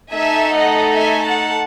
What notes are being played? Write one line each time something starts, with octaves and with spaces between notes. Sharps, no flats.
A3 D#4 A4 E5 G#5
D#5 F#5
E5 G#5
F#5 A5